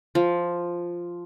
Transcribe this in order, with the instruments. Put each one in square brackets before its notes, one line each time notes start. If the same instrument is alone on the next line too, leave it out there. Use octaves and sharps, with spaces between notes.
[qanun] F3